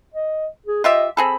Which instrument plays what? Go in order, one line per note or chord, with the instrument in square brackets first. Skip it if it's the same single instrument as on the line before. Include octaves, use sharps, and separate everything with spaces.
[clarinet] D#5
G#4
[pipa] F4 G4 E5 [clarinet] D#5
[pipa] C4 G#4 A4 [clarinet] B5